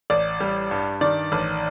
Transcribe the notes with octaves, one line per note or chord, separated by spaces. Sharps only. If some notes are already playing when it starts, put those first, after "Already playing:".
A1 D5
G3
G2
D#3 D5
A1